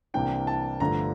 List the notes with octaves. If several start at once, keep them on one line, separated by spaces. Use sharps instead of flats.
C2 C3 E3 A#3 D4 G5
A5
G1 G2 D3 F3 A3 A#5